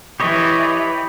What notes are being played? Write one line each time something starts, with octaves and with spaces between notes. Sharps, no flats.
E3 G4 C#5 D#5 B5